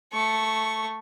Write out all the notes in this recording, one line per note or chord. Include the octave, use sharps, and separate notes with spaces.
A3 C#6